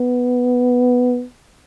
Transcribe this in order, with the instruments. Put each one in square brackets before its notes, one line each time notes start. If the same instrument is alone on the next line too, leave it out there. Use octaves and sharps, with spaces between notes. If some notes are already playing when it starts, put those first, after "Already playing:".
Already playing: [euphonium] B3